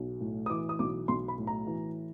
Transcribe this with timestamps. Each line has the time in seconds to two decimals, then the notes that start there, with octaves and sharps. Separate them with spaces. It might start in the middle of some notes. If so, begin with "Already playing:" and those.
Already playing: B1
0.21 A2
0.46 D#6
0.50 E3 D6
0.69 D#6
0.79 B1 D6
1.08 B1 C6
1.28 B5
1.38 A2
1.47 A#5
1.67 E3